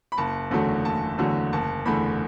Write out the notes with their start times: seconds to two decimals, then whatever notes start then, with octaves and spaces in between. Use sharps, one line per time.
0.12 B5
0.18 F#1 A5
0.51 E2 D3 F#3 A3
0.85 F#1 A5
1.18 E2 D3 F#3 A3
1.53 F#1 A5
1.85 E2 D3 A3 B5